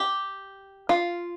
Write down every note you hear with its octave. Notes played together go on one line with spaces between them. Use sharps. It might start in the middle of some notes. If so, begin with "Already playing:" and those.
Already playing: G4
F4